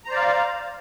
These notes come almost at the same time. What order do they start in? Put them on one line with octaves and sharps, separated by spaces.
A#5 C5 D5 F5